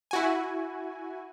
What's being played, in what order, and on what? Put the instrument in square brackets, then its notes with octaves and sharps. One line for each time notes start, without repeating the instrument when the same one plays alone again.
[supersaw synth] E4 F#4 G#5